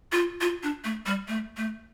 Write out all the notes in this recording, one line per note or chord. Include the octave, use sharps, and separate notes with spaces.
F4
F4
D4
A3
G3
A3
A3